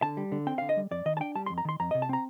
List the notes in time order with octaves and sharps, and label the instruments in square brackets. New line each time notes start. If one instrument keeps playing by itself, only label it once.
[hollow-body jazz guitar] D3 A5
G3
D3
C4 G5
D3 F5
D#5
G3
F2 D5
D#3 D#5
A5
D4 G5
G3 A5
F2 C6
A#5
D#3 C6
F2 A#5
C3 D#5
A5
C4 A#5